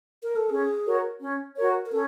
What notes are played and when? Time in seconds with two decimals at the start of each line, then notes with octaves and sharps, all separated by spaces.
0.23 A#4
0.36 A4
0.49 C#4 G#4
0.85 F#4 A#4 C#5
1.21 C#4
1.56 F#4 A#4 C#5
1.86 A#4
1.92 C#4 A4